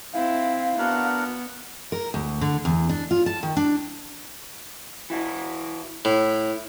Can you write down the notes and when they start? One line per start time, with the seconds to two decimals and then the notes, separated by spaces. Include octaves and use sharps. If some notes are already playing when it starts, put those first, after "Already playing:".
0.13 C4 E4 F5
0.79 B3 D4 F#4 A#4
1.92 A#4
2.14 D2
2.41 D3
2.65 E2
2.89 D4
3.11 F4
3.26 A5
3.43 D#3
3.57 D4
5.10 E3 E4 F#4
6.05 A2 E4